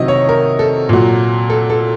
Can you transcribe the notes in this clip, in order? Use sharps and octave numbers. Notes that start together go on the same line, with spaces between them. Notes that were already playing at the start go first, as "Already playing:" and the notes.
Already playing: C3 D#3 F#3 D#5
C#5
A#4
A4
A#2 F#3
A4
A4